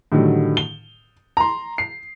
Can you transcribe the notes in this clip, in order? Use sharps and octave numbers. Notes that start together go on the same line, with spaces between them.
A2 D3 D#3 F#3 G3
G7
A#5 C6
C7